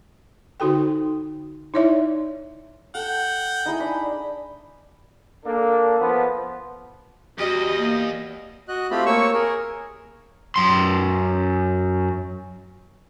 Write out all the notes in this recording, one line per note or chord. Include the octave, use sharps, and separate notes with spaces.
D3 D#4 F#4 A4 G5
D#4 E4 C#5 D5 E5
A4 F#5 G5
D#4 E4 G#4
D4 B5
A#3 D4 A4
F3 B3
E2 G3 F#4 D#5
A#3
F#4 D#5 F#6
A3 C4 F4 G4 B5
A#3 C#5 C#6 E6
G#4 A#4
F#2 C6